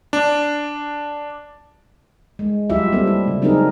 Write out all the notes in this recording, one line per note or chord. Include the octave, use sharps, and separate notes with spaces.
D4
G#3
F#3 G3 E4 F4 G4 E5
G3 A#3 C4 A4
E4
C#3 A3
F#3 C4 D4 D#4 G#4 A#4